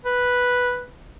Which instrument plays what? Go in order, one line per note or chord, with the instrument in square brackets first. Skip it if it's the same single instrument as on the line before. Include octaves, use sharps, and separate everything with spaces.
[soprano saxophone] B4